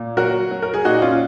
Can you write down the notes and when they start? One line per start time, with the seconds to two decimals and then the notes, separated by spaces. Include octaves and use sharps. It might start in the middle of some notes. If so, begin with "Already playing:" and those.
Already playing: A#2
0.17 F#3 F#4 A#4
0.51 F#3
0.62 A#4
0.74 G#4
0.85 A#2 D#4 F#4
1.02 C#4 F4